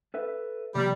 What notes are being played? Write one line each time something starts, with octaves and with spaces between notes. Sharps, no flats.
A4 B4 E5
C3 F3 G3 A#3